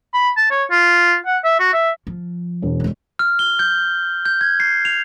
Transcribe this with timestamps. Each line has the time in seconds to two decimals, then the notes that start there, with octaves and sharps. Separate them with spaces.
0.14 B5
0.37 A5
0.51 C#5
0.71 F4
1.26 F#5
1.44 E5
1.59 F#4
1.73 E5
2.07 F3
2.62 E1
2.80 G2 G#3
3.19 F6
3.39 G7
3.59 G6
4.26 G6
4.41 G#6
4.60 C7
4.85 F7